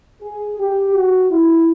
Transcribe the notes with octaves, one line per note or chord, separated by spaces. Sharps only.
G#4
G4
F#4
E4